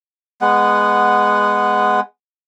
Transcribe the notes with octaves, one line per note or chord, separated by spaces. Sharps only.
G#3 B3 F#5